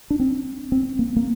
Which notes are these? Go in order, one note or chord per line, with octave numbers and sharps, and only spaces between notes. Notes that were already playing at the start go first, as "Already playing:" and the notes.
D4
C4
C4
A#3
A#3